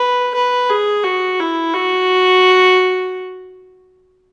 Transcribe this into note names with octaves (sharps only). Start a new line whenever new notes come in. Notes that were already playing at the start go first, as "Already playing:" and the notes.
Already playing: B4
B4
G#4
F#4
E4
F#4